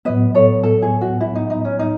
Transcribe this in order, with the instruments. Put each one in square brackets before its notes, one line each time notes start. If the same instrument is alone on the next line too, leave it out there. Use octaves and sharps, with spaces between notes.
[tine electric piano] A2 F#3 B3 [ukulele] B4 D#5
[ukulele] A4 C#5
A4
G#4
F#4
E4
D#4
D#4
C#4
D#4